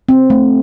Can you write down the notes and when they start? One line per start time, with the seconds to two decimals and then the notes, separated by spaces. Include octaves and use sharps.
0.09 C4
0.30 A3